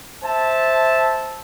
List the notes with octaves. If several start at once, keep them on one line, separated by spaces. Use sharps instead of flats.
C5 E5 A5